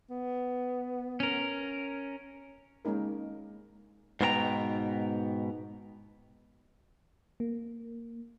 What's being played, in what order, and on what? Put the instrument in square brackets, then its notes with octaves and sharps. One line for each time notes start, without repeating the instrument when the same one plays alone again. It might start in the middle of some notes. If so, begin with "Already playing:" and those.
[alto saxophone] B3
[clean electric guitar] C#4 A#4
[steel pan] G#3 A#3 C#4 D#4 A#4
[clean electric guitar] G#2 B2 B3 A#4 G5 A#5
[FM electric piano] A#3